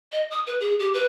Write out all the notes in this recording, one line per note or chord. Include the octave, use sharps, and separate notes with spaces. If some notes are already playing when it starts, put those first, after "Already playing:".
D#5
D#6
B4
G#4
G4
B4